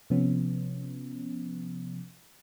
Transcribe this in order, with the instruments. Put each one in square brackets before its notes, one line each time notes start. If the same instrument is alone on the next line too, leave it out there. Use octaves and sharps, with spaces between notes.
[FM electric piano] C3 F3 B3 C#4